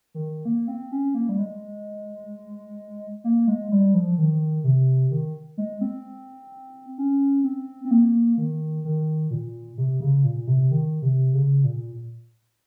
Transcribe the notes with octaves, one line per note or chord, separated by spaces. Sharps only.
D#3
A#3
C4
C#4
A#3
G3
G#3
A#3
G#3
G3
F3
D#3
C3
D#3
G#3
C4
C#4
C4
C4
A#3
D#3
D#3
A#2
C3
C#3
A#2
C3
D#3
C3
C#3
A#2